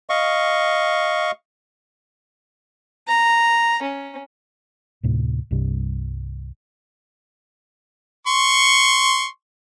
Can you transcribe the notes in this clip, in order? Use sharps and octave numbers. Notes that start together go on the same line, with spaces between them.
D#5 F5 C#6
A#5
C#4
D2 A2 C3
C2 G2 C3 G3
C6 C#6